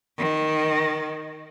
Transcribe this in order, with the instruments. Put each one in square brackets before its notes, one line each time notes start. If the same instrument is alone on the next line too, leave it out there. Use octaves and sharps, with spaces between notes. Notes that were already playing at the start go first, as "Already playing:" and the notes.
[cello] D#3